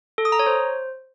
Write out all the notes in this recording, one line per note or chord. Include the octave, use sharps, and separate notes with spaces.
A4
D#6
A#5
C#5
C5